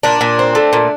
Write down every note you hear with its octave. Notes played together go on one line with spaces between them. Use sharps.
A#2 D4
A#2
C4
A3
A#2